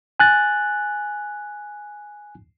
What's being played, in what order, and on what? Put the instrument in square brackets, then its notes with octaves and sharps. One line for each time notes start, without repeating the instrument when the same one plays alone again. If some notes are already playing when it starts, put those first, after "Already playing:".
[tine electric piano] G#5 F#6 A6